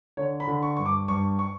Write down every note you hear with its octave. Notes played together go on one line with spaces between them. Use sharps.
D3 C#5
B5
D3
C#6
G2 C#6
D6
G2 C#6
C#6